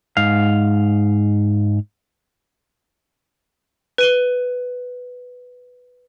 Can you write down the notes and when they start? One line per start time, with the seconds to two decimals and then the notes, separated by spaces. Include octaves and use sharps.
0.17 G#2 F5
3.98 B4 D#7 G7